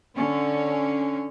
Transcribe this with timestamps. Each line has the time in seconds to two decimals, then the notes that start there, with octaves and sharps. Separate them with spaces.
0.15 D3 C#4